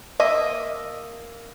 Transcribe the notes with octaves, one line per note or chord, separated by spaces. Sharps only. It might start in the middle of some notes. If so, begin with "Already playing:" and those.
A#3 D#5 E5